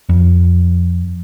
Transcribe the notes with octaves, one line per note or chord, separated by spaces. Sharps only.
F2